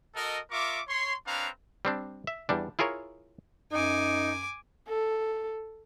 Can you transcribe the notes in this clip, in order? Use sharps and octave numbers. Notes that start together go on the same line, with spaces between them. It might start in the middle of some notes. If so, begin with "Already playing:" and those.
F#4 A4 A#4 D#5
F4 A#4 E5 C#6 D6
C#5 C6
C4 D4 B4 C#5 F5 A#5
G3 C4 D4
E5
E2 G3 D4
E4 F4 G#4 A#4 C#5
F#2 D#4 G#5 D6
A4